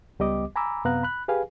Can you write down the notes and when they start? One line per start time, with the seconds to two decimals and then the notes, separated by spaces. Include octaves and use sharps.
0.19 C#2 G3 B3 G4 D#5 D6
0.56 G#5 A#5 B5 D6 E6
0.85 F#2 C3 B3 F5 A#5 F#6
1.03 B5 F#6
1.28 G4 G#4 B4 F5 G#5